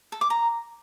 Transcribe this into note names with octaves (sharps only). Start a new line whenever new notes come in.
A4
D6
A#5